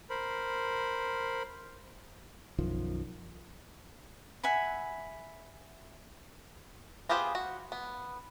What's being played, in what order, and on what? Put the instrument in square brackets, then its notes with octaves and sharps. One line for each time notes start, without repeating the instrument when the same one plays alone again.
[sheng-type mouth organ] A#4 C5 B5
[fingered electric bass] B1 F#2 D#3 F3
[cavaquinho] E5 F#5 G#5 B5
[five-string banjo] B3 F4 G4 G#4 C5
F#4
B3